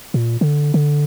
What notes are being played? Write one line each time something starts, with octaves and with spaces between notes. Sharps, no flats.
A#2
D3
D3